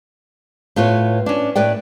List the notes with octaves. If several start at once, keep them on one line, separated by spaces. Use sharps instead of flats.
A2 F4 B4 C#5
C#4 D4
A2 B4 D5 G5